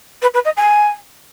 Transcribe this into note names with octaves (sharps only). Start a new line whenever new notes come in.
B4
B4
D#5
G#5